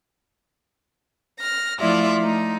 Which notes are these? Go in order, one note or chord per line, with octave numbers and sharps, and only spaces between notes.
F6 A#6
F3 A3 E4 F4 D5 E5
A3 D#4